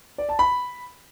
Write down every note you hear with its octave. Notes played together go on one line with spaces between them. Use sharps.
D5
A5
B5